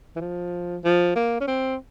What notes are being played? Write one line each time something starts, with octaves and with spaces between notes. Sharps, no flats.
E3
F3
F3
A#3
C#4
C4